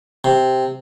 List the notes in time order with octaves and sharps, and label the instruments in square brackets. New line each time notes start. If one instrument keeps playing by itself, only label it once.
[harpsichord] C3